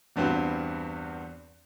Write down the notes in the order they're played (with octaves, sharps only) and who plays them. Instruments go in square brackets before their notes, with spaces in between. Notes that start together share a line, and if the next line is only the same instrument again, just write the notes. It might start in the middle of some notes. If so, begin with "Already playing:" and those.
[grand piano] E2 G2 B3 C4 F#4